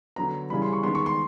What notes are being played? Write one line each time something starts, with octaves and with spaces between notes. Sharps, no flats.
D3 F#3 B3 A#5
C#3 E3 G3 B5
C6
C#6
D#3 G#3 B3 C6
C#6
C6